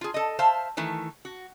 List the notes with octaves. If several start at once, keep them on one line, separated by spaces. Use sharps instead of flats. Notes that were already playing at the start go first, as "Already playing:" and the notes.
F4 G#4
A4 D#5
C5 E5 F5 A5
D#3 E3 A3
F#4